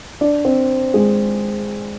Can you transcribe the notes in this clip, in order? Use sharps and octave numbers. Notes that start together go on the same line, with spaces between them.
D4 D5
C4 C5
G#3 G#4